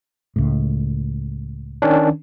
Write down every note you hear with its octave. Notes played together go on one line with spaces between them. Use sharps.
C#2 A2
D#3 C#4 D4